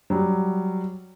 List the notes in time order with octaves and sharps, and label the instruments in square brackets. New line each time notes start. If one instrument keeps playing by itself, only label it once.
[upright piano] F#3 G3